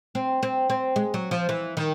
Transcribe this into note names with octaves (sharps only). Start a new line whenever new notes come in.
C4
C4
C4
G#3
F#3
F3
E3
D#3